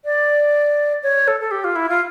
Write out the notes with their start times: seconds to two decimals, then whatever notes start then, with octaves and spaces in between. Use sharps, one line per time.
0.05 D5
1.03 C#5
1.28 A4
1.40 A4
1.51 G4
1.64 F4
1.76 E4
1.89 F4